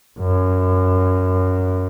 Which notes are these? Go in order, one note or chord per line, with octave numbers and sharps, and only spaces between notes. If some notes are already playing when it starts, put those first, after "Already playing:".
F#2